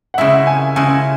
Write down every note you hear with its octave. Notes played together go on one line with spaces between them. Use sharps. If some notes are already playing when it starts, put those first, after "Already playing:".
F#5
C#3 G#3 E4 E5
G#5
C#3 G#3 E4 G#5